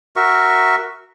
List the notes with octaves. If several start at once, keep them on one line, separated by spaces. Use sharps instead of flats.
F#4 A#4 E5 C#6